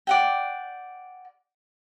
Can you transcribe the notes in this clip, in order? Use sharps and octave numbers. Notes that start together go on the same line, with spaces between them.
D5 F#5 G5